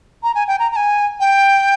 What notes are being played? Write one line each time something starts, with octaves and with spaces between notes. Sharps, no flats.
A#5
G#5
G5
A#5
A#5
G#5
G5